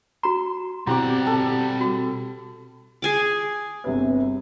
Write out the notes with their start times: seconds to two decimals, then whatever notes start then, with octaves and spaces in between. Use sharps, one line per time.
0.23 F#4 A#5 C6
0.87 B2 G3 C4 E4 G4 F#5 D6
1.27 A4
1.81 F#4
3.02 G#4 G#5 D6
3.84 G1 C3 B4